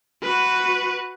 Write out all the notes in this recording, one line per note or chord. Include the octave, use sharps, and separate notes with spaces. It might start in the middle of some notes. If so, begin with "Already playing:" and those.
F#4 B4